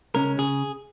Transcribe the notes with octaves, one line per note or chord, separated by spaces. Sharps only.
C#3 G#3 C#4 A#4
C#3 G#4